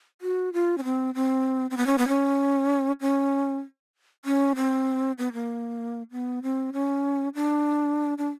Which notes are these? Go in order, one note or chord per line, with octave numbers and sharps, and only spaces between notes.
F#4
F4
C#4
C4
C4
C4
B3
C#4
B3
C#4
C#4
C#4
C4
B3
A#3
B3
C4
C#4
D4
D4